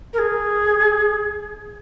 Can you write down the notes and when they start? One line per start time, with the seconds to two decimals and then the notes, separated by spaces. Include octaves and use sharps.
0.13 A#4
0.18 G#4